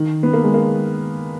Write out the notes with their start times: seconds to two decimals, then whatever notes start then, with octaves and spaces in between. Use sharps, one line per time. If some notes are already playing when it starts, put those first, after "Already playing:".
Already playing: D#3
0.23 B3
0.33 A#3
0.44 G#3
0.54 A#3